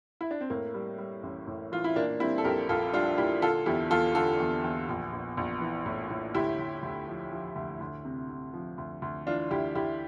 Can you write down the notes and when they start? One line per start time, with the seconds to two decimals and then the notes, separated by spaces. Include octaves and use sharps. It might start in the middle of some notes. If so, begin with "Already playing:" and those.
0.21 E4
0.31 D4
0.41 C4
0.50 A2 A#3
0.74 G3
0.98 G3
1.23 A1
1.47 A2
1.72 E3 F4
1.84 E4
1.96 A#2 A#3 D4
2.20 G3 C4 E4
2.38 A4
2.44 A#1 G4 A#4
2.69 A#1 F4 A4
2.93 G3 D4 F4
3.18 A#2 E4 G4
3.42 D3 F4 A4
3.66 E2 E4 G4
3.91 E2 F4 A4
4.15 D3 F4 A4
4.40 E2
4.64 E2
4.89 A#1
5.13 A#1
5.37 A#1
5.61 E3
5.86 A2
6.10 A2
6.34 D2 E4 G4
6.59 D2
6.83 D2
7.07 F3
7.32 F3
7.56 D2
7.80 D2
8.05 C3
8.29 C3
8.54 F3
8.78 D2
9.02 D2
9.26 E3 D4 F4
9.51 D2 E4 G4
9.75 D2 E4 G4